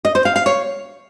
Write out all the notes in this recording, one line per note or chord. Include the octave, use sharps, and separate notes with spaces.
D#5
C5
F5
F5
C#5